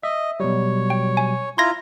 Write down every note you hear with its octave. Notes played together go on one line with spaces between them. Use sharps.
D#5 E5
B2 F#3 G3 C#5
G5
G#5
E4 F4 A#5 C6 G#6 A#6